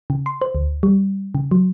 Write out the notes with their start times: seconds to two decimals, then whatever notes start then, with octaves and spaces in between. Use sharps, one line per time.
0.10 C#3
0.26 C6
0.42 C5
0.55 D2
0.83 G3
1.35 C#3
1.51 F#3